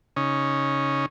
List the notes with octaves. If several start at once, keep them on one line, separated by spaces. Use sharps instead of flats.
C#3 C#4 D#4